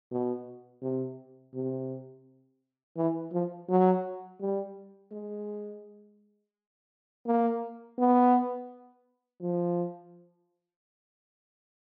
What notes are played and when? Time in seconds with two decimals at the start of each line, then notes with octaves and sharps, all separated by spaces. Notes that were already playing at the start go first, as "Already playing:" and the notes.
0.11 B2
0.82 C3
1.54 C3
2.97 E3
3.32 F3
3.69 F#3
4.41 G3
5.11 G#3
7.26 A#3
7.98 B3
9.41 F3